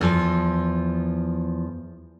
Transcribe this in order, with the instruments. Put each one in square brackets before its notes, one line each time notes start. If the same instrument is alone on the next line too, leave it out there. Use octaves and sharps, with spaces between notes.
[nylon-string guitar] E2 F3